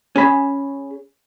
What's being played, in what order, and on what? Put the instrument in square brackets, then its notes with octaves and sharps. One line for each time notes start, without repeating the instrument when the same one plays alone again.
[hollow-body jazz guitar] C#4 G#4 B5